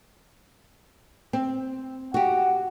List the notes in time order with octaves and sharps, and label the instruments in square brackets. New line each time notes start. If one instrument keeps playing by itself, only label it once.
[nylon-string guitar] C4
[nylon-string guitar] F#4 G4 [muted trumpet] F#5